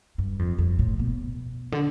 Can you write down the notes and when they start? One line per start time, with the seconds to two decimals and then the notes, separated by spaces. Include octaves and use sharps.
0.18 G2
0.39 F2
0.58 F2
0.79 A2
0.99 B2
1.72 D3